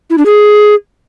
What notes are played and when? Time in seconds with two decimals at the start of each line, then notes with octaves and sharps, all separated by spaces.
0.10 E4
0.18 D4
0.26 G#4